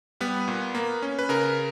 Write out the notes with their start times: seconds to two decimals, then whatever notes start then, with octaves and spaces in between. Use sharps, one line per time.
0.20 G3 B3 B4
0.48 A#2
0.75 A#3
1.02 C#4
1.19 B4
1.29 C#3 A#4